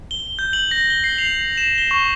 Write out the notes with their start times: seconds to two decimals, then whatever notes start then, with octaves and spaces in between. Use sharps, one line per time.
0.11 G7
0.39 G6
0.53 F#7
0.71 A#6
0.90 G7
1.04 C7
1.18 F7
1.57 E7
1.78 G7
1.91 C#6